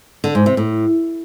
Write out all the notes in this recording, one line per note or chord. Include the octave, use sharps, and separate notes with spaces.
D3
G#2
C3
A2